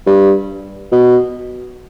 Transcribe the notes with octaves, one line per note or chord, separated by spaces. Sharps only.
G2
B2